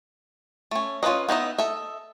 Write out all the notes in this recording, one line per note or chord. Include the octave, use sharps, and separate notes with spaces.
A3 C#4
C#4 F4 A#4 B4 D#5
B3 D#4 E4 D#5
A4 D#5 E5